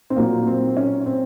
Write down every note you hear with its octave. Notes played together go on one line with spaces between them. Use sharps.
C4
A#2 F#3 A#3
C4
C#4
C4